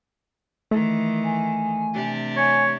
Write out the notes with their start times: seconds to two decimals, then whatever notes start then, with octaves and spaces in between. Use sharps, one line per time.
0.71 D#3 E3 A3
1.24 G#5
1.93 C3 D4 G4
2.37 C#5 G#5